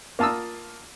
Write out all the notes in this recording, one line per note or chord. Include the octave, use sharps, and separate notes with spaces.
A#3 F4 A5 D#6 E6